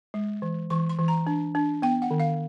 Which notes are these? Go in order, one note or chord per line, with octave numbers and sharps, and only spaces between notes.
G#3
E3
E3 C#6
C6
E3
A#5
D4
D4
B3 G5
F#5
D#3
F5